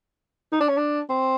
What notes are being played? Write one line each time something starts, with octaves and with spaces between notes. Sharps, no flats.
D#4
D4
C#4
D4
C4